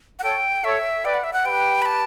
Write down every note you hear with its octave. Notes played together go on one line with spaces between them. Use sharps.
F#5
A4 C#5 G5
A4 C#5 E5
B4 D5 G5
F#5
E5
F#5
G4 B4 G5
B5
A5